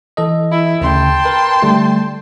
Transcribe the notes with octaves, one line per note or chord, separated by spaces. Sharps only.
E3 A4 D#5
E4
D2 C#3 G5 A5 C6
A#4 B4
D3 G3 A3